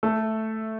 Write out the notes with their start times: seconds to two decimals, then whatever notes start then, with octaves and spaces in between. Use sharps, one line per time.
0.03 A3 A4